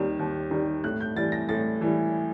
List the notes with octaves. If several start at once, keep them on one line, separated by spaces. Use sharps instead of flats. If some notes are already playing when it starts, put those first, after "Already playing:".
Already playing: D#2 D#3 G3
D#2
D#3 G3
A2 F#6
G6
E3 G3 A6
A#6
A2 A6
E3 G3